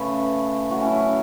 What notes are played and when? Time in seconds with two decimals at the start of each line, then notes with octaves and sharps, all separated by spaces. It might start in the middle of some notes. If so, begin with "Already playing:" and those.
Already playing: C#3 A3 B4
0.70 A2 F#3 A3 F#4
0.81 C#4 E4
1.00 C#4